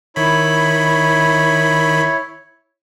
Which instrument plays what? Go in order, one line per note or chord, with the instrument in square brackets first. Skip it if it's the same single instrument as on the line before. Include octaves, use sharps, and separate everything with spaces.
[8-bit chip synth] D#3 B5 [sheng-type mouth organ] E4 C#5